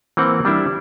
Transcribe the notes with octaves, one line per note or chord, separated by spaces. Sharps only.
E3 A#3 C4 F#5
G3 D4 E4